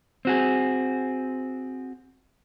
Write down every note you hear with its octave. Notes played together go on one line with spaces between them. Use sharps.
C4 F#4 G#4